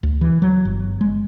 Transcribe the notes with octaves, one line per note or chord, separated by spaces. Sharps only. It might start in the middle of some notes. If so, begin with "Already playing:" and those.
D2
E3
F#3
G1
G#3